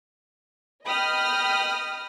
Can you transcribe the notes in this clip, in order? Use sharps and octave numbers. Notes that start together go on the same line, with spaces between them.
D#5 G5 B5 D#6 F6